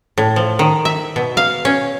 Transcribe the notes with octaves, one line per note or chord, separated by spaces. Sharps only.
A2
F3
D#3
E5
B2
F5
C#4